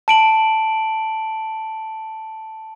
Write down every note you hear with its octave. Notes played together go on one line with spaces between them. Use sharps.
A5 D7 F#7